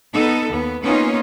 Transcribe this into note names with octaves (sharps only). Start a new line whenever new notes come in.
B3 D#4 A4
D#2 B3
A#3 B3 C#4 D#4 F4